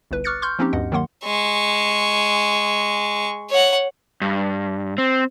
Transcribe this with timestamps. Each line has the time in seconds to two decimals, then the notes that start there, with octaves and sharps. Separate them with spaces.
0.11 G1 C2 B4
0.24 C#6 D6 F6 F#6 A6 C#7
0.42 C6 C#6 F6 G6
0.59 F3 A#3 C4 C#4 D#4 G4
0.73 D2 G2 D#5 F#5
0.92 D#3 F#3 A#3 F#5 C6
1.24 G#3 C#6
3.50 C#5 F#5
4.21 G2
4.98 C4